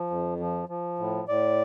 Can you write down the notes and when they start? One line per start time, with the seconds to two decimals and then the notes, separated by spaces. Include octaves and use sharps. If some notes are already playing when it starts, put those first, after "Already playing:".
Already playing: F3
0.10 F2
0.40 F3
0.69 F3
0.99 A2
1.28 A2 D5